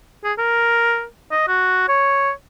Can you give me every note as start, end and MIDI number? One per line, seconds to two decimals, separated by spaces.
0.24 0.33 68
0.38 1.04 70
1.31 1.45 75
1.48 1.84 66
1.89 2.31 73